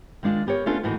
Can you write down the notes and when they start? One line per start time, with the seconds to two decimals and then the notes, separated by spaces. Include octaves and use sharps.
0.23 D#3 G#3 D4 F4
0.47 B3 G4 A#4 C#5
0.66 A3 B3 C#4 D4 F4 A4
0.83 D#2 A2 E3 D#4 F#4